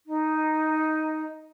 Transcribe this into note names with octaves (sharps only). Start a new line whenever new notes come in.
D#4